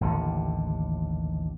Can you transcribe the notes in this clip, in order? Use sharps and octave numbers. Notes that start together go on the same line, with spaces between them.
A1 D#2 D3